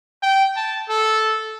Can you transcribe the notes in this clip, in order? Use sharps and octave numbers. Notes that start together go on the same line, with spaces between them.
G5
A5
A4